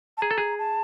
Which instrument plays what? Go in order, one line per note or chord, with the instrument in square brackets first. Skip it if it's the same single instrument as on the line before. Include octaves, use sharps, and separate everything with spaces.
[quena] A5
[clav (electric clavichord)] G#4 [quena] A#5
[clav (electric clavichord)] A4
G#4
[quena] A5